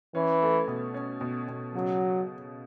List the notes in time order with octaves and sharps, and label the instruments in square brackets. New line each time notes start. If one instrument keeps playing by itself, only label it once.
[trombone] E3 [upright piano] C#4
[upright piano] A3
B2
C#4
B2
B2
[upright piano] C#3 [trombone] F#3